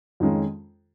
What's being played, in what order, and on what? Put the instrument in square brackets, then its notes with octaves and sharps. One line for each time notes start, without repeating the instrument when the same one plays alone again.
[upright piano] F2 D#3 G#3 C#4 F4